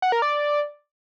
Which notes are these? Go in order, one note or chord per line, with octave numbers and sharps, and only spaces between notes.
F#5
A#4
D5